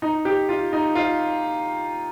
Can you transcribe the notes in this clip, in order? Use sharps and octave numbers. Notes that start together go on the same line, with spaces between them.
D#4
G4
F4
D#4
F4